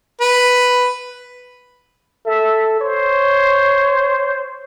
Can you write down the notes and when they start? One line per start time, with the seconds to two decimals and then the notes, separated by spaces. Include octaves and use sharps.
0.21 B4
2.26 A4 E5
2.81 C5 C#5